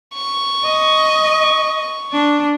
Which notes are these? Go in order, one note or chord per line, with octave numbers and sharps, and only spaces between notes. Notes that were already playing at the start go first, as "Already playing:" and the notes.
C#6
D#5
D4